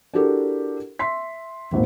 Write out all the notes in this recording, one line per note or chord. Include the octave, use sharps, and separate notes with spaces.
D4 E4 F#4 G4 A4 A#4
E5 C6 B6
D#1 G#1 A#2